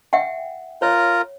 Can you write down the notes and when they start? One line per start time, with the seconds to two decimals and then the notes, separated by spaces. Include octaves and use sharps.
0.13 E5 F#5 G5
0.82 F4 A#4 C#5 A#5